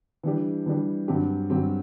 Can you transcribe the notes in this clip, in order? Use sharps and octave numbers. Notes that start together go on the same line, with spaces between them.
E3 G3 D4 G4
E3 G3 D4 G4
G2 F#3 C4 G4
G2 F#3 C4 G4